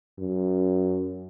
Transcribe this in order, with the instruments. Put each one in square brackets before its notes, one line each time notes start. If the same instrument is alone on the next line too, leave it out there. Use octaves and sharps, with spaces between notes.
[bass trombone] F#2